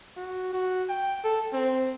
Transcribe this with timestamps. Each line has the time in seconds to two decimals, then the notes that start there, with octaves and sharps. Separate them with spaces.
0.17 F#4
0.53 F#4
0.89 G5
1.24 A4
1.53 C4